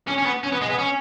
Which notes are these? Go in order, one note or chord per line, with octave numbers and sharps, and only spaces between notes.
C#4
C#4
B3
C#4
B3
G#3
B3
C#4